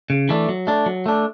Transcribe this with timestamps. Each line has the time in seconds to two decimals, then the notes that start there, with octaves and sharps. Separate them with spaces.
0.10 C#3
0.29 E3 A3 D4
0.49 F#3
0.67 A3 D4
0.86 F#3
1.06 A3 D4